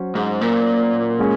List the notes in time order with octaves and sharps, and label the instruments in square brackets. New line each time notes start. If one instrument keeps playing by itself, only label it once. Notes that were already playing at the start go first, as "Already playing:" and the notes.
Already playing: [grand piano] F#3 C#4 F#4 C5
[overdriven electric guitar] G#2
A#2
[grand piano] G#3 C#4 G#4 C#5